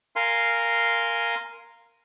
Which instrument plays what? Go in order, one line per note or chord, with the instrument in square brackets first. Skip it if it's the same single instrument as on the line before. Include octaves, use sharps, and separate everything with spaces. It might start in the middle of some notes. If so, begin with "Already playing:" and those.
[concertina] A#4 F5 G#5 C6